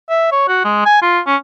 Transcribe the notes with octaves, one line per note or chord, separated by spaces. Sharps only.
E5
C#5
F#4
G#3
G#5
F4
C#4